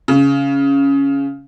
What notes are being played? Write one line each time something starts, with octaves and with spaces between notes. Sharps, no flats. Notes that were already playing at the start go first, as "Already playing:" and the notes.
C#3